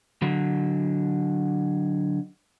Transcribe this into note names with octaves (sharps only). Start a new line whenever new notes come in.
D3 F#3